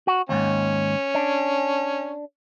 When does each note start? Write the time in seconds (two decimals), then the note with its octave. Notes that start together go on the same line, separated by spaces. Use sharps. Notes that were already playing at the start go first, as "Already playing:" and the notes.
0.07 F#4
0.29 D#2 G#2 C#4
1.15 D4